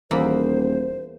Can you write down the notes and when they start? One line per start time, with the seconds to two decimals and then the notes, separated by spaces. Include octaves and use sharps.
0.11 D#1 E2 A#3 C5 B5